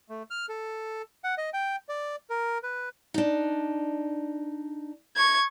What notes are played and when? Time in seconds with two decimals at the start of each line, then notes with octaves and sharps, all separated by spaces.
0.09 A3
0.30 F6
0.49 A4
1.24 F#5
1.38 D#5
1.53 G5
1.89 D5
2.30 A#4
2.63 B4
3.14 D4 D#4
5.17 C#6 G#6